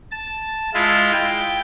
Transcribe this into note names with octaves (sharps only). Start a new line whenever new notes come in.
A5
G#3 E4 F4
G5